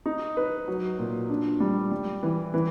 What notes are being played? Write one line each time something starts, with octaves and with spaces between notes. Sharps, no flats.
D#4
B4
F#3
A#2
D4
G3
G3
E3
E3